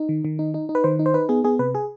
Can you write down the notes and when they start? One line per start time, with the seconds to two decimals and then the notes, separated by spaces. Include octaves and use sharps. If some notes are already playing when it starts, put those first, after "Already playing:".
Already playing: D#4
0.09 D#3
0.25 D#3
0.39 D#4
0.54 D#4
0.69 D#4
0.75 B4
0.84 D#3 C5
0.99 D#4
1.06 C5
1.14 D#4 B4
1.29 B3 G#4
1.44 B3 G#4
1.59 C3 B4
1.75 G#4